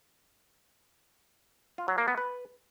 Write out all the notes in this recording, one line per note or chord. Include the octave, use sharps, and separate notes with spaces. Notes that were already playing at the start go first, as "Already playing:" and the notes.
F4
F#3
A#3
B3
B4